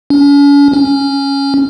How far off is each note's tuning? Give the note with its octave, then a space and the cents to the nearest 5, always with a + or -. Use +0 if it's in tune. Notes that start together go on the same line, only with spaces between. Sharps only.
C#4 +45
C#4 +0